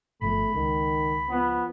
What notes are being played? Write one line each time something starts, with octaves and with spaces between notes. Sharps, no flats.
G1 F3 A3 B3 B5
C#2 D#3
F3 B3